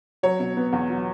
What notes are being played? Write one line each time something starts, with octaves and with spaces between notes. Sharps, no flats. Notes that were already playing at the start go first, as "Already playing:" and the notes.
F#3 C#5
B2
B3
E2
F#3